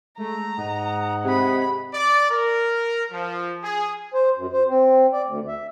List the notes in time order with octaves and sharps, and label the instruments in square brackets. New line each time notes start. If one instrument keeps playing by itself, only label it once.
[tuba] G#3 [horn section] A3 [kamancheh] A#5
[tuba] G#2 [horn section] D#5 F#5
[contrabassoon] C3 [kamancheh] G#4 B5
[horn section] D5
A#4
F3
G#4
[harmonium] C5
F#2
C5
C4
D5
D2
E5